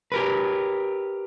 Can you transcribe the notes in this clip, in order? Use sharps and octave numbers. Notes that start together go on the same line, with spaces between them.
G4 A#4 B4